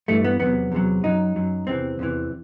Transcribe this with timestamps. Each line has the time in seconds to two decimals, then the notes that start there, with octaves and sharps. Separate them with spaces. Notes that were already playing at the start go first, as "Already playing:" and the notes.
0.08 G2 E3 A3
0.24 B3
0.40 E2 C3 F#3 B3
0.72 E2 C3 F#3
1.03 F#2 F#3 D#4
1.36 F#2 F#3
1.67 E2 C3 E3 C4
1.99 E2 C3 E3